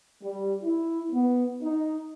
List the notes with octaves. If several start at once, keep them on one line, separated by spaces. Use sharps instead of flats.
G3
E4
B3
D#4